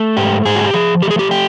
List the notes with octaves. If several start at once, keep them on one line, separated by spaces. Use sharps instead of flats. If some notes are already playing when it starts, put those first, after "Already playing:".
Already playing: A3
G#2 G4
G#2 G#4
F#4
G4
F3 G#4
A3 G4
G#4
G4
G4